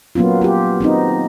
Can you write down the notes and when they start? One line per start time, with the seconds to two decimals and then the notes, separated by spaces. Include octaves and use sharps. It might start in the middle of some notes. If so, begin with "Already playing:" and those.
0.15 F#3 A#3 B3 C#4 F4
0.41 F4 G4
0.81 B3 C4 D#4